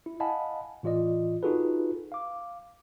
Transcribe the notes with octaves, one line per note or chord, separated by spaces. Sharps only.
E4
D#5 F5 F#5 G#5 A5 B5
A2 E3 F4 D5 D#5
D#4 F4 F#4 G#4 A4 B4
F5 D6